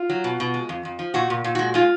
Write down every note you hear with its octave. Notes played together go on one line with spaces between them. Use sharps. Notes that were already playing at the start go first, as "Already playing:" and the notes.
Already playing: F4
F#3
B2
B2
G#3
F2
F2
F3
A#2 F#4
A#2
A#2
G#3 F#4
G#3 F4